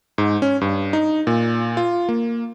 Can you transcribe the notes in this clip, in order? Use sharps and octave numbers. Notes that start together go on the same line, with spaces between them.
G#2
C#4
G2
D#4
A#2
F4
A#3